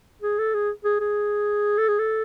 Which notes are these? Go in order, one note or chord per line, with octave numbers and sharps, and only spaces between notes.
G#4
A4
G#4
G#4
G#4
A4
G#4
A4